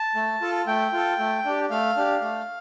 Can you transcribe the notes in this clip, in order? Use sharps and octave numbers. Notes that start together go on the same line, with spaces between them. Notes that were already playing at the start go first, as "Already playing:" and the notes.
Already playing: A5
A3
F4 A4
A3 G5
F4 A4
A3
D4 G4
A3 F5
D4 G4
A3